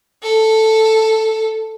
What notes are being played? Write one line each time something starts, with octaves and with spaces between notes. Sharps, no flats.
A4